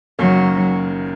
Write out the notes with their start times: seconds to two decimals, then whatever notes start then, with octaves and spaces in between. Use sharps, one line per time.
0.18 F#1 F#2 D#3 F#3 A#3 C#4